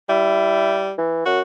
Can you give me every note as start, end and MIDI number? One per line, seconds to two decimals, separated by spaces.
0.09 0.92 55
0.09 0.88 64
0.98 1.25 52
1.26 1.41 42
1.26 1.41 66